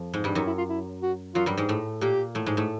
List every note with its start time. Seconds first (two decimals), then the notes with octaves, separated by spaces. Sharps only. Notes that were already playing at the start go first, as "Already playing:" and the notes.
Already playing: F2 F3
0.14 G#2 G#3
0.24 G2 G3 D4
0.35 F#2 F#3 D#4
0.47 E4
0.58 F4
0.69 E4
1.02 F#4
1.35 F#2 F#3 F4
1.46 G2 G3
1.57 G#2 G#3
1.69 A2 A3
2.01 A#2 A#3 G4
2.35 A2 A3
2.46 G#2 G#3
2.57 A2 A3